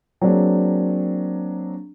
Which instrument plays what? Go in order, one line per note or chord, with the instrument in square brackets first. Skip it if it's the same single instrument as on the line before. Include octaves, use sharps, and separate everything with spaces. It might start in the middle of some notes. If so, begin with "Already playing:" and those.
[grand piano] F#3 A#3 C4 D4 G#4